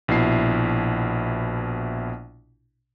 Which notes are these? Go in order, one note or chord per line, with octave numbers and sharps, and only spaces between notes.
A#1 B2 E4 C7